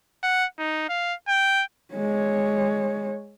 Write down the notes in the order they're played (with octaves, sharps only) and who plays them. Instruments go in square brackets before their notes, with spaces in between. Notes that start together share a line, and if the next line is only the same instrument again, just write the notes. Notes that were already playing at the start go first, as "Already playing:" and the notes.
[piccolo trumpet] F#5
D#4
F5
G5
[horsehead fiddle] G#3 C#5